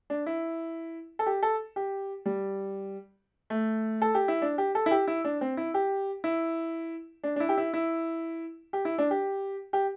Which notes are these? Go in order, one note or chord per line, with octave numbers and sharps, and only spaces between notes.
D4
E4
A4
G4
A4
G4
G3
A3
A4
G4
E4
D4
G4
A4
E4
G4
E4
D4
C4
E4
G4
E4
D4
D4
E4
G4
E4
E4
G4
E4
D4
G4
G4